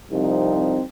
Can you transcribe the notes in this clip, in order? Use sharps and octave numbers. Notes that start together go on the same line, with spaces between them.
C2 C3 F3 C4 D#4